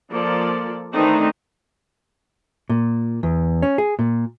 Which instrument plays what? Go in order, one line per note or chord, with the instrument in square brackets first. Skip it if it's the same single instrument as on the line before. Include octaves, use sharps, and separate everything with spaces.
[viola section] F3 A#3 A4 D5
D#3 E3 A3 C4 D4 D#4
[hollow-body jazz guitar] A#2
E2
C#4
G#4
A#2